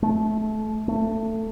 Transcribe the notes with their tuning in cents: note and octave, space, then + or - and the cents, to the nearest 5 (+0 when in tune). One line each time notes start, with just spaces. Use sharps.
A3 -25
A3 +15